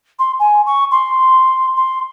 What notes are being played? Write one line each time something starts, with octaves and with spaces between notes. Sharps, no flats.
C6
G#5
C#6
C6
C6